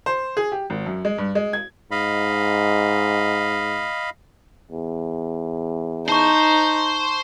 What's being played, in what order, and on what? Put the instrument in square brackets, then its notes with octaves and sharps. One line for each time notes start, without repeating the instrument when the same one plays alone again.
[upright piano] C5
G#4
G4
G#1
F#2
G#3
G2
G#3
G#6
[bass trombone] G#2 [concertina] D#5 F5 B5
[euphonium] E2
[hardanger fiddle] D#4 [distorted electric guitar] C5 [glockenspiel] A5 C#6